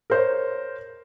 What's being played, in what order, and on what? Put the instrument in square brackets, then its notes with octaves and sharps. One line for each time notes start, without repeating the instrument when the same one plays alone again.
[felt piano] A#4 C5 C#5